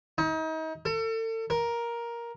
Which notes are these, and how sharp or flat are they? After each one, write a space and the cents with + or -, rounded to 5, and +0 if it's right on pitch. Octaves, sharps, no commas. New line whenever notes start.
D#4 +35
A4 +35
A#4 +10